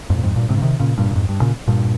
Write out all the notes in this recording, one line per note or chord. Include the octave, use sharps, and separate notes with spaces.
F2 G#2
A#2
F2 G#2
G2 A#2
G#2 C3
C#3
C3 D#3
A#2 C#3
G2 A#2
A#2
F2 G#2
G2
A#2 C#3
G2 A#2